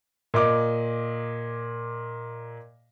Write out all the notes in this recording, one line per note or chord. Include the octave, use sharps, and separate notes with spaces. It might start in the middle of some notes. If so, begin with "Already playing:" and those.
A#2 D#5 D6